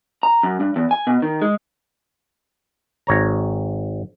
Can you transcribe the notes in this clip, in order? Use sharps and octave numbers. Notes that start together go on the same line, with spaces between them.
A#5
F#2
G2
E2
G#5
B2
D#3
G#3
G#1 C#5 A#5